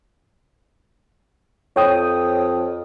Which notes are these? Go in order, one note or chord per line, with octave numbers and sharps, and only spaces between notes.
F2 C#5 G5 D#6